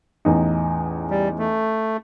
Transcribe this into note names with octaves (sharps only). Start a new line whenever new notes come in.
A1 E2 D#4
G3
A3